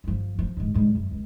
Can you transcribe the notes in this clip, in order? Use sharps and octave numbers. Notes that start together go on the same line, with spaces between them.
G1 F3
F3
G#2 C#3
G#2 G3
F#2
C#2